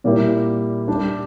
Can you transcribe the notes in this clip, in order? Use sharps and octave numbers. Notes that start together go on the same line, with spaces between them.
A#2 G3 A#3 E4
G3 D4 G4